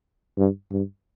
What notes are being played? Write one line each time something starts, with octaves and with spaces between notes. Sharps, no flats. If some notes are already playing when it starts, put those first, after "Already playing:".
G2
G2